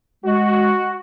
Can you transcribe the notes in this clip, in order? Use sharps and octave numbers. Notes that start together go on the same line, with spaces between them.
G#3 F#4